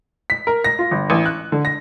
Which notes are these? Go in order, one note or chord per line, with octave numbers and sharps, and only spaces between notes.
B6
A#4
A#6
F4
G1
A1
F#6
D3
A#6